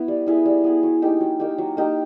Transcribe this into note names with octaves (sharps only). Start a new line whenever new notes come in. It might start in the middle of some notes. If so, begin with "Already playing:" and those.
Already playing: B3 E4
G3
B3 E4 G#4
G3
B3 E4 G#4
F#3
A#3 D#4 G4
F#3
A#3 D#4 G4
F#3
A#3 D#4 G4